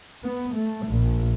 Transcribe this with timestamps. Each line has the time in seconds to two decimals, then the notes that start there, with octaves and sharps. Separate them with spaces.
0.23 B3
0.54 A3
0.87 A#1